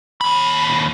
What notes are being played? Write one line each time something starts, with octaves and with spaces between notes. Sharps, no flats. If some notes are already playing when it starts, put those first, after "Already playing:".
D#2 B5